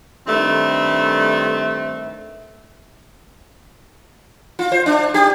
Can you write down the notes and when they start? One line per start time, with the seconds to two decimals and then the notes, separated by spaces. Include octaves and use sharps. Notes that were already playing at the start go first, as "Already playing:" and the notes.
0.27 G2 D#3 A3 C4
4.59 F4
4.72 C5
4.86 D4
5.14 G4